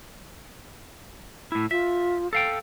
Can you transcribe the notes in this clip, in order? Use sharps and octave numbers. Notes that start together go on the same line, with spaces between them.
A2 E4
F4 E5
A4 F5 G5